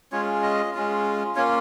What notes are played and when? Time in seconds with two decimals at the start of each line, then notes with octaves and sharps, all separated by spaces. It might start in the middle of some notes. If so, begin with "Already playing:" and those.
0.12 G#3 C#4 F4 C#5
0.43 D#5
0.74 G#3 C#4 F4
1.35 A#3 C#4 F4 C#5